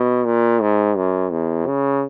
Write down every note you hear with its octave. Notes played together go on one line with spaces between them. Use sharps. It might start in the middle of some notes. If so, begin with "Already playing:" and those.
Already playing: B2
A#2
G#2
F#2
E2
C#3